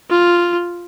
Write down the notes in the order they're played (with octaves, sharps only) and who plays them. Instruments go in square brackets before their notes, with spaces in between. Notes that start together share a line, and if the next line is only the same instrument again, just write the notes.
[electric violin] F4